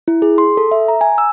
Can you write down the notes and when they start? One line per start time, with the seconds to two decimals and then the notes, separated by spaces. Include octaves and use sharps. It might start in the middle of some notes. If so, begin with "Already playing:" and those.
0.08 E4
0.22 G#4
0.38 C6
0.57 A4
0.71 E5
0.88 A#5
1.01 G#5
1.18 E6